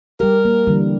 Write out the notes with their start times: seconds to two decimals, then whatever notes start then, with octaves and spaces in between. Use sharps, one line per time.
0.20 G3 G4 A#4
0.45 A#3
0.67 D3 E3 G3